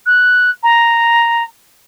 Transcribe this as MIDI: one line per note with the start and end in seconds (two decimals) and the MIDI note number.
0.06 0.51 90
0.63 1.43 82